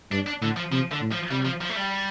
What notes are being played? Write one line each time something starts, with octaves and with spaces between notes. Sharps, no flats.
G2 D4
D4
A2 D3
F3
C3 F3
D3
A2
F3
C3 G3
F3
F3
A3
G3